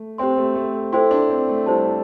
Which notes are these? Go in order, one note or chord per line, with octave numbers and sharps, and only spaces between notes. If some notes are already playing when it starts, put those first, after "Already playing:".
Already playing: A3
C4 G4 C5 G5 C6
A3
A3
E4 A4 C5 G5 C6
D4
C4
A3
G3 E4 C5 A5